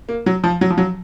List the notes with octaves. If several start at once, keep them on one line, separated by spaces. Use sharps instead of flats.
A#3
F#3
F3
F#3
F3
F#3